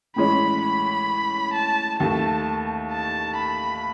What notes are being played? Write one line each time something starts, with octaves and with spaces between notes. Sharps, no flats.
A2 E3 G#3 C#4 B5
B5
A5
D#2 D#3 A3 A5
A5
B5